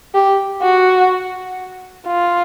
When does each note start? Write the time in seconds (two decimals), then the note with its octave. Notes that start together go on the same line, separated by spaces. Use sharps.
0.15 G4
0.62 F#4
2.07 F4